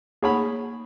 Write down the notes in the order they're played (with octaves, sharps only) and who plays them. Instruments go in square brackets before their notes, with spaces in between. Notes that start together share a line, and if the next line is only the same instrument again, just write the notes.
[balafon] A#3 D#4 F#5 [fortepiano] G#4 C#5 B5